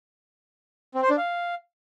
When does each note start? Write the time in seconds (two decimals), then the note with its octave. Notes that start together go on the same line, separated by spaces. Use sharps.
0.94 C4
1.02 C5
1.10 D4
1.18 F5